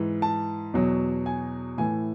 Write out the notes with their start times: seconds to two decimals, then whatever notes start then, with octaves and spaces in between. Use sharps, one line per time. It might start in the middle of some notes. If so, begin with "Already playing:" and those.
Already playing: G#2 E3
0.22 A5
0.74 E2 B2 F#3
1.26 G#5
1.78 A2 E3 G#5